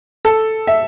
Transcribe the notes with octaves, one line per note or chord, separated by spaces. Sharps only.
A4
E5